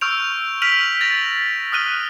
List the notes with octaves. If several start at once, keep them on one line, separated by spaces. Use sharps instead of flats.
C#6 E6 F6 G6 D7 F7
F6 B6 D7 D#7 F7 F#7
A6 A#6 F7
D#6 F6 F#6 D#7 G7